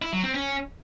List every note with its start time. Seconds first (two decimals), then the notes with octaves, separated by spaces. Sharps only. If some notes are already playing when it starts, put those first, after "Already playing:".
0.02 E4
0.13 F#3
0.24 C4
0.34 C#4